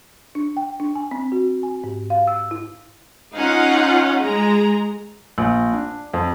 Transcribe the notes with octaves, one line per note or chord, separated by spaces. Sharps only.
D4
G5
D4
G#5
C4
F#4
G#5
G#2
F5
E6
E4
C#4 D#4 F4 F5 F#5
G#3 G#4 A#5
A#1
D4
F2